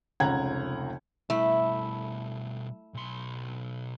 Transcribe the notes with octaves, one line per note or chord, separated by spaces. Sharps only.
F1 C#2 C#5 F#5 A#5 G#6
B2 G3 A3 E4
B1 C6